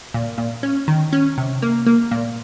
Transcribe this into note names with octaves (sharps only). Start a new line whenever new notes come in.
A#2
A#2
C#4
D#3
C#4
C3
A#3
A#3
A#2